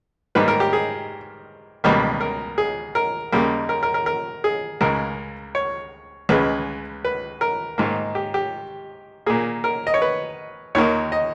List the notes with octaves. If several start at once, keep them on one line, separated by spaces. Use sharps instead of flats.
G#2 D#3 G3 A#3 B4
A#4
G4
G#4
C#2 B2 G3 A#3
A#4
G#4
A#4
D#2 C#3 G3 A#3
A#4
A#4
A#4
A#4
G#4
C#2 C#3 G#3 A#4
C#5
C#2 C#3 G#3 B4
B4
A#4
G#2 D#3 A#3
G4
G4
A#2 A#3 G#4
A#4
D#5
C#5
B4
D#2 D#3 A#3 C#5
D#5